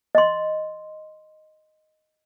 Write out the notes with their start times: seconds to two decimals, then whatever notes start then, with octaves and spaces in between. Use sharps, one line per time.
0.15 D#5 C6